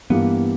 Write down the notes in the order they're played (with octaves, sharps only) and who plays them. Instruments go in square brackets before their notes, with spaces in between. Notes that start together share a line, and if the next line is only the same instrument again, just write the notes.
[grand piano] G2 E3 A#3 [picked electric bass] B3